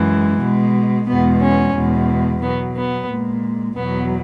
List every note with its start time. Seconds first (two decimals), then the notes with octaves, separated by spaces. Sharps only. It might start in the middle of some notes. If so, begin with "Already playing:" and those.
Already playing: F#2 E3 G#3
0.41 B2 G#3
1.08 E2 B2 G#3 B3
1.41 C#4
1.75 E2 B2 G#3
2.42 B2 F#3 B3
2.76 B3
3.09 A#2 G#3
3.76 E2 B2 F#3 B3